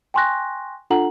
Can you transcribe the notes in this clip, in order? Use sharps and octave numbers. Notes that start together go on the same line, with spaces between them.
G5 G#5 C6 C#6 F#6 A#6
D4 F4 A4 F#5 A#5 F#7